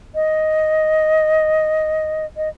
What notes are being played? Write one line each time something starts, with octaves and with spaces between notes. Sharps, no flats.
D#5
D#5